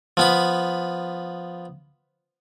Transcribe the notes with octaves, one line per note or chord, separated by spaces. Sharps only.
F3 B3 B5